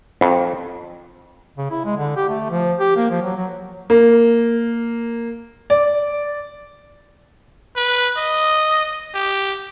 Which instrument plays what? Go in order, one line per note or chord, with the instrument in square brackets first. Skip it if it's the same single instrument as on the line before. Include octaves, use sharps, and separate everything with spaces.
[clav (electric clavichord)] F2
[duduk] C#3
E4
G#3
D3
G4
A3
F3
G4
A#3
F3
F#3
F#3
[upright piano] A#3
D5
[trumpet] B4
D#5
G4